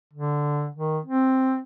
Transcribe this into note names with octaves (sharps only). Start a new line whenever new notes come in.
D3
D#3
C4